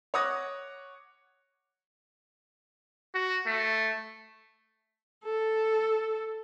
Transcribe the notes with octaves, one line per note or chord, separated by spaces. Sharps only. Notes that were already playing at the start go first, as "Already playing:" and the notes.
C#5 F#5 D6 D#6 F#6 A#6
F#4
A3
A4